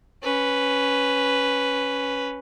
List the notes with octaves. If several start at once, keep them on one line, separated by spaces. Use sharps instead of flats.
C#4 B4